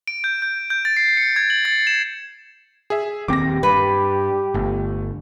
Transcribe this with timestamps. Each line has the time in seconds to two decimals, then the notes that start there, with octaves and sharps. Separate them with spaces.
0.08 D7
0.24 G6
0.42 G6
0.70 G6
0.85 A6
0.97 C7
1.17 C#7
1.36 G#6
1.50 F#7
1.65 A6
1.87 E7
2.90 G#4 E5
3.28 D#1 D#2 C4 G4 D6 A#6
3.63 G2 B4
4.54 G1 A3